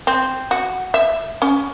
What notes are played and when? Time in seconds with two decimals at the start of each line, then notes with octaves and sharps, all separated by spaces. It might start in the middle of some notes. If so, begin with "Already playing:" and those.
0.07 C4
0.51 F#4
0.94 E5
1.42 C#4